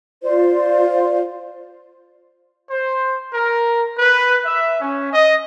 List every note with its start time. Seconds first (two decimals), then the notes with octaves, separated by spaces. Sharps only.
0.23 F4 C5 D5
2.70 C5
3.33 A#4
3.99 B4
4.46 E5
4.81 C#4
5.13 D#5